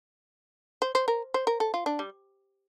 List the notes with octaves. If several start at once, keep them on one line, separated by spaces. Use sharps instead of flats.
C5
C5
A#4
C5
A#4
A4
F4
D4
G3